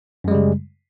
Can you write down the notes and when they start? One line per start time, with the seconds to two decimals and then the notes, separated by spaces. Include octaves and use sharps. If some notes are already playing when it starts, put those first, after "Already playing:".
0.24 F#2
0.28 G#3
0.31 G3
0.35 C#3